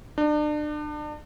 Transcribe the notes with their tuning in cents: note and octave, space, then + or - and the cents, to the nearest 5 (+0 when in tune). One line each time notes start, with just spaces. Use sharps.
D4 +35